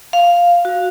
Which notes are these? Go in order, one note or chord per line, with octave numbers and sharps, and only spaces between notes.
F5
F#4